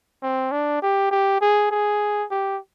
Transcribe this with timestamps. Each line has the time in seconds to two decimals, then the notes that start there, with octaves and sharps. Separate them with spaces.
0.22 C4
0.52 D4
0.82 G4
1.11 G4
1.41 G#4
1.71 G#4
2.31 G4